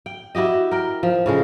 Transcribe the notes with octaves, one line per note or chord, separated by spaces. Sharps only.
G5
E4 F#4 G4 D#5
A#4 G5
F3
A2 C#3 G#3